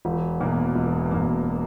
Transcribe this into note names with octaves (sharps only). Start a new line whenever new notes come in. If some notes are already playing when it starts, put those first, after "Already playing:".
E1
E2 B2 A#3
E1
E2 B2 A#3